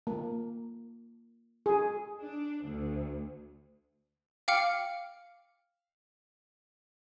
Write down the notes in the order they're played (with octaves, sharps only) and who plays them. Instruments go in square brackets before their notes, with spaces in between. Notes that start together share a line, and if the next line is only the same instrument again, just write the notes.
[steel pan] A#3
G#4
[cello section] D4
D2
[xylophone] F5 G5 D6 F6 C#7